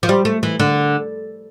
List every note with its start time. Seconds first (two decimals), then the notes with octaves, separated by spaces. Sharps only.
0.03 F3
0.09 G3
0.25 A3
0.43 E3
0.60 D3